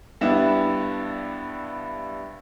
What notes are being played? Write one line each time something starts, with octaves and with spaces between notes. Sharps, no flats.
G2 G3 B3 D4 E4 E7